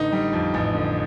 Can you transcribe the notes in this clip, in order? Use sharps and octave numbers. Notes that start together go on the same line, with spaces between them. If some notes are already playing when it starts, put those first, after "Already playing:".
Already playing: A1 D3 D#4
G3
F2
A1
D3